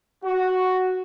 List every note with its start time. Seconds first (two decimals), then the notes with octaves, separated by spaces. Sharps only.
0.24 F#4